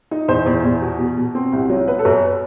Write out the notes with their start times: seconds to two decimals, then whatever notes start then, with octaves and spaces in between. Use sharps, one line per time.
0.11 D#4
0.28 E2 C5
0.46 E2
0.64 E2
0.82 B2
0.99 B2
1.17 B2
1.35 C4
1.53 C2
1.70 F#3
1.87 B3 B4
1.99 A4
2.05 F#2
2.10 B4